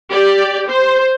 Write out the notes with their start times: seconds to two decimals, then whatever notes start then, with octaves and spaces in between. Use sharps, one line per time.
0.11 G4 D5
0.69 C5